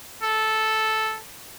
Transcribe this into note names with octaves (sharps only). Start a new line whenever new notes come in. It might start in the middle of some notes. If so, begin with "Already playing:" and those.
A4